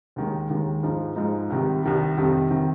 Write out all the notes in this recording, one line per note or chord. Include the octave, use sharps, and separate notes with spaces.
D#2 D#3 G#3
D#2 D#3 G#3
G#2 F3 G#3 D#4
G#2 F3 G#3 D#4
C2 C3 D#3 G3
C2 C3 D#3 G3
F2 C3 D#3 G3
C3 D#3 G3